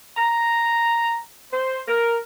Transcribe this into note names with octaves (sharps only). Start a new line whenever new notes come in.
A#5
C5
A#4